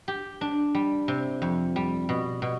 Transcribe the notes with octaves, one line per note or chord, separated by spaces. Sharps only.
G4
D4
G3
C3
F2
G3
B2
B2